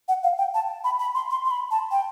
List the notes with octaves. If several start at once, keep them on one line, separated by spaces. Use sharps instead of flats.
F#5
F5
G5
A5
B5
B5
C6
C6
C6
B5
A5
G5